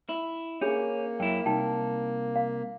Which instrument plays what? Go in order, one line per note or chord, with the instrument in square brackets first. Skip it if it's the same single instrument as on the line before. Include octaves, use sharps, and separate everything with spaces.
[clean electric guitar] E4
[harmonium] A#3 [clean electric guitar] C#4 [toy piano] D4 G#4
[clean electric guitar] F#2 E4 [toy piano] G5
[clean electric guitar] C2 [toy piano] D#4 G5
[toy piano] F5